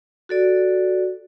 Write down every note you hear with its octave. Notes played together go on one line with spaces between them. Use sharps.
F#4 A4 D5